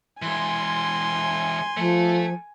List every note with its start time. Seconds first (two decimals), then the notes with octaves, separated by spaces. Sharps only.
0.22 E3 G#3 G#5 C6
1.77 F3 A3 A4